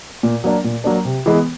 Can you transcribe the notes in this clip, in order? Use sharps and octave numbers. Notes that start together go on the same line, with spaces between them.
A#2
F#3 A#3 D4
A#2
F#3 A#3 D4
C3
E3 G#3 B3